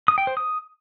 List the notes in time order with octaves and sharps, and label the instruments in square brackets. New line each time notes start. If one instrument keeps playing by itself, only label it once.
[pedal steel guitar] D#6
G5
C5
D#6